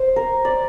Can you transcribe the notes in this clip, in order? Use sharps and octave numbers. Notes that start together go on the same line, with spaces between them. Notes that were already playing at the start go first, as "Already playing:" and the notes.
Already playing: C5
A#4
D5